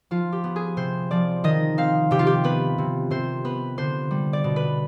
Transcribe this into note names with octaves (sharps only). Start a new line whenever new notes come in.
F3 F4
G4
B3
G#4
C3 C5
F3 D5
D#3 D#5
C4 F5
C3 G4
F4
G4
B3 B4
C3
C3 C5
B3 B4
D3 C5
G3
D5
B2
B4